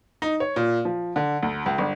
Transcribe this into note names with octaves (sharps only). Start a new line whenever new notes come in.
D#4
C#5
A#2
F3
D3
D2
C#2
G1